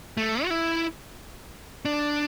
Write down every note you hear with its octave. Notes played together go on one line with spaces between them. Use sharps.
A3
F#4
E4
D4